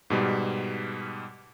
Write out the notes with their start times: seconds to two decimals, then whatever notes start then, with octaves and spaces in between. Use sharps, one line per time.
0.10 G#2 B2 G3